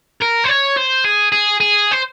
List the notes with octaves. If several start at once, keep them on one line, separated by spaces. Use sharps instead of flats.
A#4
C5
C#5
C5
G#4
G#4
G#4
C5